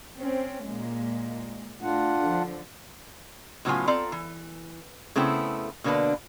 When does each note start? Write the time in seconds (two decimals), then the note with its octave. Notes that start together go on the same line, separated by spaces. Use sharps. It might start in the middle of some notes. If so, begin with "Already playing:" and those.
0.18 C4 C#4
0.64 A#2 G#3
1.82 A2 D4 F4 F#5
2.21 D3 F3
3.65 A2 C#3 F#3 B3 F4 G#5
3.87 C4 F4 A4 D5 A#5
4.12 E3
5.16 C#3 A3 B3 C4 E4
5.84 B2 D3 A#3 D4 B4